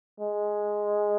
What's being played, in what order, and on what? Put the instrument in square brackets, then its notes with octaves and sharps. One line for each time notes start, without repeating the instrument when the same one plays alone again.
[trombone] G#3